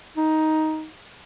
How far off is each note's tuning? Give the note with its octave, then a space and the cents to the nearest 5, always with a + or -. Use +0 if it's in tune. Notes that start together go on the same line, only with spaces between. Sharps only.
D#4 +10